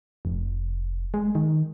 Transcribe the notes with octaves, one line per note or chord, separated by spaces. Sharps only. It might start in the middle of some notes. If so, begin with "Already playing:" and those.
F1
G#3
D#3